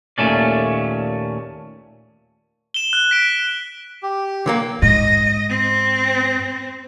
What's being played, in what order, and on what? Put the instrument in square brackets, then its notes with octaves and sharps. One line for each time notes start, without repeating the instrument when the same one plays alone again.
[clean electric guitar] D#2 A#2 F#3 A3 C#4 D5
[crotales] E7 G7
F#6
B6 D7
[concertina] G4
[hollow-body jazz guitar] D3 F#3 A#3
[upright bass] G#2 [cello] D#5
[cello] C4